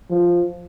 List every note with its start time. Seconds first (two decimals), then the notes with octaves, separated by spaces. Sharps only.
0.10 F3